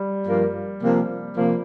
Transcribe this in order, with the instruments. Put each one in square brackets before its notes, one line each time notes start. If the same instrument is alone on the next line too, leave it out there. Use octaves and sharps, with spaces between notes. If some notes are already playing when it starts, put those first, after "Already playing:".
Already playing: [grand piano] G3
[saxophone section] G2 F3 A#3 F4 A#4
C3 F3 A#3
C3 F3 A#3